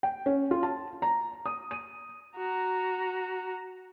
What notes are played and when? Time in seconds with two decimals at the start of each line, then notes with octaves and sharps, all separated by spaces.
0.03 G5
0.26 C#4
0.51 F4
0.63 A5
1.02 A#5
1.46 D#6
1.71 D#7
2.37 F#4 A#5